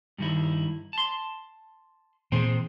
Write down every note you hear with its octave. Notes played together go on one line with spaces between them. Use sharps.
G2 D#3 E4
A5 C6
A#2 E3 C4 G#4 C5 G5